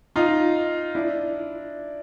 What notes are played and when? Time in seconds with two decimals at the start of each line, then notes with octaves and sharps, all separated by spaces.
0.16 D#4 F4
0.95 D4 E4